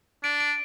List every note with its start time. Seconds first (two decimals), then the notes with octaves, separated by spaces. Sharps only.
0.24 D4 D7
0.40 D7